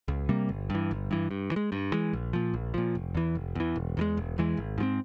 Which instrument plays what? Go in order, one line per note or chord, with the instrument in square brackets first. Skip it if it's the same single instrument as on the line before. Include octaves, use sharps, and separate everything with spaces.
[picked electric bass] C#2
C3 G3 A#3
G1
G2 E3
G1
G2 E3
G2
E3
G#3
G2
E3 G#3
A#1
A#2 F3
A#1
A#2 F3
F1
E2 E3
F1
E2 E3
E1
E2 E3 G#3
E1
E2 E3 G#3
G#1
G#2 F3 C4